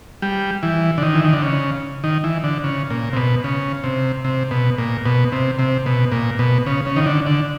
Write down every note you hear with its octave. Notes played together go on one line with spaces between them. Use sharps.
G3
E3
D3
D#3
E3
D#3
D3
C#3
D#3
E3
D3
C#3
A#2
C3
B2
C#3
C3
C3
B2
A#2
B2
C3
C3
B2
A#2
B2
C#3
C#3
D#3
D3
D3